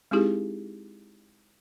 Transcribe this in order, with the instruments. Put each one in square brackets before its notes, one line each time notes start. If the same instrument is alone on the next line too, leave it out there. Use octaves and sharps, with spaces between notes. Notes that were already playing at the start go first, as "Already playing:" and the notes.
[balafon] G#3 C4 D#4 E4 G4 G#4